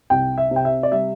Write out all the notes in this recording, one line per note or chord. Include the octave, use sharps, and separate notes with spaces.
C2 G5
E5
C3
G5
E5
D5
G3 E5